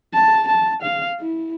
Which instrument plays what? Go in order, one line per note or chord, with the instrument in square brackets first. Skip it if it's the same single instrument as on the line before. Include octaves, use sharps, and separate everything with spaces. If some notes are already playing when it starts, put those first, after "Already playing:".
[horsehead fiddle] A5
A5
F5
E4